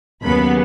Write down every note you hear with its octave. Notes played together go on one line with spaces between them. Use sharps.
D#2 C#3 F#3 B3 B5